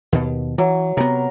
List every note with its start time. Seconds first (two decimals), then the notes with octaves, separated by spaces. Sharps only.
0.12 D#2 B2
0.58 E3 F#3
0.97 C3 B3 A#4